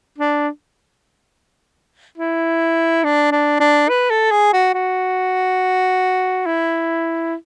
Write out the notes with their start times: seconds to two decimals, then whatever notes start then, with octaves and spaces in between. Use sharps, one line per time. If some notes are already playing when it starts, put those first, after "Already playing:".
0.18 D4
2.18 E4
3.04 D4
3.32 D4
3.60 D4
3.89 B4
4.10 A4
4.31 G#4
4.53 F#4
4.74 F#4
6.46 E4